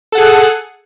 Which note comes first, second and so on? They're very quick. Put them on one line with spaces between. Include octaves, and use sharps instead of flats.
A4 F#5 G#4